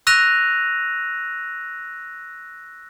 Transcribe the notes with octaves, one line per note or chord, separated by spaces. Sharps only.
C#6 E6 F#6 A#6 D#7 F7